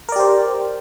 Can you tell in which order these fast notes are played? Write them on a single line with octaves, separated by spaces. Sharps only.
A#4 D5 G4 C5